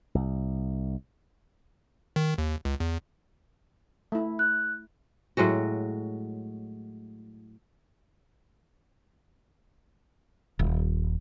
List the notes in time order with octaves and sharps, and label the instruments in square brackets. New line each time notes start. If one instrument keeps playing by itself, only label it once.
[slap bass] C2
[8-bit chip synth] D#3
D#2
C#2
E2
[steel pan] A3 E4
[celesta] F#6
[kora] A2 F#3 G#3 F#4
[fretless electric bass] D#1